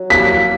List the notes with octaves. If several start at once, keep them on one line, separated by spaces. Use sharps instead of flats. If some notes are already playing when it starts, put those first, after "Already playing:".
Already playing: F#3
A#3 B6